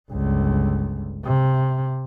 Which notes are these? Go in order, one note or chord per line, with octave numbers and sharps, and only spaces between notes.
G1 C#2
C3